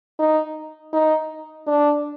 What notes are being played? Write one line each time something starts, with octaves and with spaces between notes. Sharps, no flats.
D#4
D#4
D4